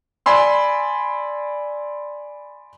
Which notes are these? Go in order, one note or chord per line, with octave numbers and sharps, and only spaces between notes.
D5 G#5 B5 C6 E6